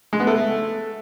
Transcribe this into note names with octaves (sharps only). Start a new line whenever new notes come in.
G#3
B3
A3